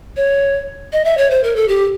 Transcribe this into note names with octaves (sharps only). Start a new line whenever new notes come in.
C#5
D#5
E5
C#5
C5
A#4
A4
G4